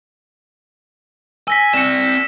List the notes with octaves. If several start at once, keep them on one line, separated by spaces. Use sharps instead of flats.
G#5 E6 A#6 B6
C4 D5 C#7 E7